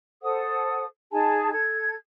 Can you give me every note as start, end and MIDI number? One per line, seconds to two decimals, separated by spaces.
0.22 0.85 69
0.22 0.85 72
0.22 0.85 78
0.22 0.85 87
1.12 1.51 63
1.12 1.51 68
1.12 1.51 80
1.12 1.51 81
1.52 1.94 69
1.52 1.94 92